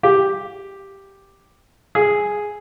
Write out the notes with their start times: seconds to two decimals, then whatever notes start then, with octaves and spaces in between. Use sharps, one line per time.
0.03 G4
1.95 G#4